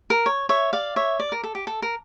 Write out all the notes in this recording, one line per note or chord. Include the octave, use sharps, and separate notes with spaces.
A#4
C#5
C#5 E5
D5 F5
C#5 E5
D5
A#4
A4
G4
A4
A#4